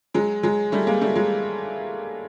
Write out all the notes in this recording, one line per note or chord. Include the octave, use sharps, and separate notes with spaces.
F#3 G#3
F#3 G#3
G3 A3
G#3 A#3
G3 A3
F#3 G#3